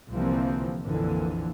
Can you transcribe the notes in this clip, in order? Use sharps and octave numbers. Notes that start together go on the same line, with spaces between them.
C2 D3 E3 F3 A#3 C4
A#1 F2 A#2 D3 E3